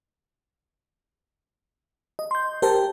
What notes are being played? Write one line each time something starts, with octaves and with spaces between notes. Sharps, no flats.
D#5
C6 G6
G4 A#4 C5 G5 A5